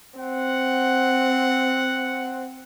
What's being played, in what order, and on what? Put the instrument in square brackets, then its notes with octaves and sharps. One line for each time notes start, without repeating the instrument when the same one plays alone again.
[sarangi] C4 [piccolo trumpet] F#5